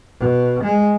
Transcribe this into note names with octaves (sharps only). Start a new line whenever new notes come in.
B2
G#3